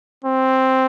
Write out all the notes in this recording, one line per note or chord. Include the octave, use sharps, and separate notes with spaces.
C4